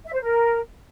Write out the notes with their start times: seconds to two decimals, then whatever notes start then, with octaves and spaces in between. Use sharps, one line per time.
0.05 E5
0.14 C5
0.22 A#4